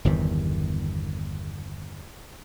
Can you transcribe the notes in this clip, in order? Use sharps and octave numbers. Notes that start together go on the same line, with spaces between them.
G1 E2 C3 D#3